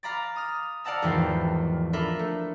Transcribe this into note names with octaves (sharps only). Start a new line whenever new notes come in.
F5 A#5 B5 D6 A6
D#6 F6
D5 F5 F#5 A5 A#5 E6
G#1 E2 E3 F3 G5 C7
D4 F4 A4 A#4 E5 B5
A3